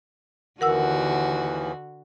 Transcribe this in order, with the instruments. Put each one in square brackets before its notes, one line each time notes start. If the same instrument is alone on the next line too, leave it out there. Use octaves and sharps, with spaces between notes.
[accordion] D#2 E3 [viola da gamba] D3 F#4 [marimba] A#4 F#5 E6